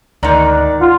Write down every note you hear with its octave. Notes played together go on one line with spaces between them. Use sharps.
D2 G#2 D#3 D5 A#5 F#6
F4 F#5